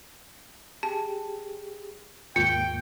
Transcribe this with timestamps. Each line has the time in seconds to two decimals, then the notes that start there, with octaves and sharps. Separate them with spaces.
0.83 G4 G#4 A5
2.36 D#2 G#2 A#3 F4 G5